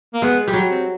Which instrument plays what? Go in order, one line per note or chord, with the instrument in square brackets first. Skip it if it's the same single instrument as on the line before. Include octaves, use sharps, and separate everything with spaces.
[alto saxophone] A#3
[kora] G#3 [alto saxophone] B3
[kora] G3
F#3
[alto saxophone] C4